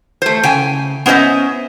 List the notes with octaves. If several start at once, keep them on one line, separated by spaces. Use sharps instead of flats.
A3 C5
C#3 G5 G#5
B3 C#4 C5 D#5 E5